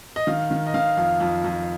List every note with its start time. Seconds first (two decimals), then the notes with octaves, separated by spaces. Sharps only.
0.16 D#5
0.27 D#3 F5
0.51 D#3
0.67 D#5
0.74 D#3 F5
0.97 F2 F5
1.20 F2
1.44 F2